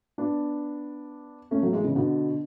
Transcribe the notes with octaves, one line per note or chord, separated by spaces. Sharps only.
B3 D4
A3 C#4
F#3 A3
E3 G#3
C#3 E3
B2 D3